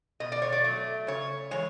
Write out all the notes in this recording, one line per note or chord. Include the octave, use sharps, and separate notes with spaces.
B2 D#5
D5
C#5
D5
F#3 A3
C#3 C#5
E3 G#3 C#5